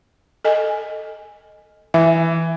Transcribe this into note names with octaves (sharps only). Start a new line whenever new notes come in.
A4 D#5 G#5
E3 E5